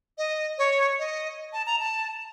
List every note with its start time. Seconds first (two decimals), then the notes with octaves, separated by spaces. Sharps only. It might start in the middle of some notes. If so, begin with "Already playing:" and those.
0.18 D#5
0.58 C#5
0.99 D#5
1.53 A5
1.67 A#5
1.80 A5